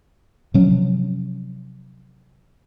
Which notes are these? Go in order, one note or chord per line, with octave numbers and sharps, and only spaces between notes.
C3 F3 F#3 C#4